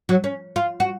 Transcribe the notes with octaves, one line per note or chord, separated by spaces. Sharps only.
F#3
C#4
F4
F#4